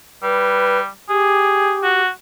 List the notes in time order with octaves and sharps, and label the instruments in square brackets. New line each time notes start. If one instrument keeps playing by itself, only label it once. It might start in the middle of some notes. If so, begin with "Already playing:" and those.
[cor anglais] G3 [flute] B4
[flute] G4 [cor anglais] G#4
[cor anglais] F#4